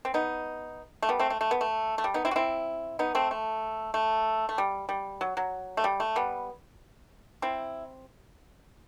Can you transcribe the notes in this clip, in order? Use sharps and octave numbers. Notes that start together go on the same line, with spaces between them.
C4
B3 D#4
A3
G3 B3
A3 C4
A3
A3
B3
A3
A3
G3
B3 D#4
C4 E4
F#4
C4 E4
B3 D#4
A3 C4
A3
A3
A3
G3
G3
F#3
F#3
A3
G3
A3
G3 B3
C4 E4